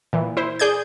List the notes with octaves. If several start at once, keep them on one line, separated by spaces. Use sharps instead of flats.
A#2 E3
E4 C5
G#4 D5 G6 G#6